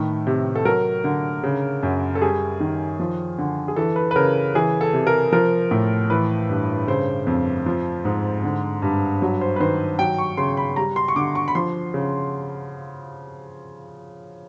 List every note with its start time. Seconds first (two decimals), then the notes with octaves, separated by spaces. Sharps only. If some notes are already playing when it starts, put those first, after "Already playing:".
Already playing: A2 D#3 B4
0.27 C3
0.55 A4
0.65 F#3 A#4
1.04 D3
1.43 C#3
1.83 F#2
2.15 A4
2.22 G3 G#4
2.60 D#3
3.00 F3
3.38 D3
3.68 G#4
3.76 E3 A4
3.96 B4
4.11 B4
4.16 C#3 A#4
4.55 E3 G#4
4.81 A4
4.93 C3
5.07 A#4
5.32 F3 A#4
5.71 A2
6.10 E3 B4
6.49 G2
6.87 C#3 C5
7.27 F2
7.66 F3
8.05 G#2
8.44 D3
8.82 G2
9.22 F#3
9.41 C5
9.56 B4
9.60 D#3 C5
9.99 F#3 G5
10.18 C#6
10.37 C#3 C6
10.57 B5
10.76 G3 A#5
10.96 C6
11.08 C#6
11.16 D3 D6
11.35 C#6
11.48 B5
11.55 F3 C6
11.94 C#3